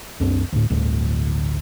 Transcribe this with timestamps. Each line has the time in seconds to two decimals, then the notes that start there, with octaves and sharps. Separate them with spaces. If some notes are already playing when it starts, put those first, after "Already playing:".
0.20 C2 F#2 C4 D4
0.52 D2 A2
0.70 G1 D2 A2 D3